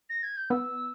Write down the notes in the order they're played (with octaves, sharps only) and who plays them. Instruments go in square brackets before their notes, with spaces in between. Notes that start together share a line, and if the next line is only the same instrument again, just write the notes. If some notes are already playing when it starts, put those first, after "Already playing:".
[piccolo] A#6
G#6
G6
[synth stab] B3 [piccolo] E6